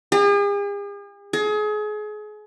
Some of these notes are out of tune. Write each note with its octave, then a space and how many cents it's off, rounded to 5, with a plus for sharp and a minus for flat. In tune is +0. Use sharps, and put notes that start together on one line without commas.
G#4 -45
G#4 +30